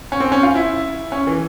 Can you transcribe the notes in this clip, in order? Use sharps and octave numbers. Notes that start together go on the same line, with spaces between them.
C#4
C4
C#4
F4
E4
C#4
E3